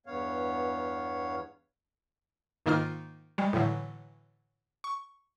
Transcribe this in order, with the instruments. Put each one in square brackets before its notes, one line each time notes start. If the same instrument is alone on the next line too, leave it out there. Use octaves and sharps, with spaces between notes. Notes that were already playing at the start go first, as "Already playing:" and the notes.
[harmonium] E2 G2 B3 C#5 F5
[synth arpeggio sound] G#2 D#3 A#3 D#4 F4 F6
G3 G#3
A2 D3 E3 F#3
C#6